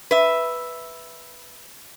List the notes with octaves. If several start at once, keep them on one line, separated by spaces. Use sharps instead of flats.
B4 E5